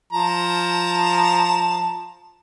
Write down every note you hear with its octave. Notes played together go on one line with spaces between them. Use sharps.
F3 A5 A#5